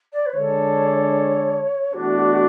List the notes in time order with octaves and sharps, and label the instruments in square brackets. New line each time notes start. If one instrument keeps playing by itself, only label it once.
[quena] D5
B4
[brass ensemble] D3 G#3 D4 A4 [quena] C#5
[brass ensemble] E2 B2 A3 D4 [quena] F#4